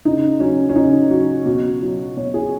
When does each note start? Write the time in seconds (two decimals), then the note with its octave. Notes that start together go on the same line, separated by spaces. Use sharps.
0.05 C#3 D#4
0.40 F#3 C#4
0.69 C#4
0.76 C#3 D#4
1.11 F#3 F#4
1.46 B2 F#4
1.82 F#3
2.17 B2 C#5
2.34 G#4